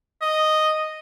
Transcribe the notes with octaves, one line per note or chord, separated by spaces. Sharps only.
D#5